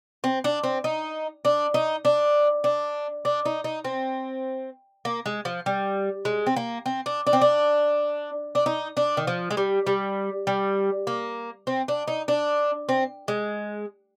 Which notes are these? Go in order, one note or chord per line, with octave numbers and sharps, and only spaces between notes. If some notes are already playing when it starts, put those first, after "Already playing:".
C4
D4
C4
D#4
D4
D#4
D4
D4
D4
D#4
D#4
C4
A#3
G#3
F3
G3
G#3
C4
A#3
C4
D4
D4
C4
D4
D4
D#4
D4
D#3
F3
G#3
G3
G3
G3
A#3
C4
D4
D#4
D4
C4
G#3